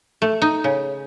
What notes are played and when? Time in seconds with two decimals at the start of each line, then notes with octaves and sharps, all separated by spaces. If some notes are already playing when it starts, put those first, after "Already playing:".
0.22 A3
0.42 D#4
0.64 C#3